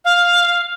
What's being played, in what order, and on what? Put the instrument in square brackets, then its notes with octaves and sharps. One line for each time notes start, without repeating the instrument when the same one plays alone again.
[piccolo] F5